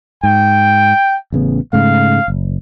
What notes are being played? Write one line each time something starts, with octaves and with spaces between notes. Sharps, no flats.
G#2 G5
A1 C#3 B3
G#2 C#3 A3 F5
F#1